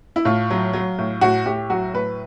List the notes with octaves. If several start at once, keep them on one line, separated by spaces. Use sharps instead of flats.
E4
A2 F4
F#3
F#3
A2
A2 F#4
A2 G4
F#3 F#4
A2 B4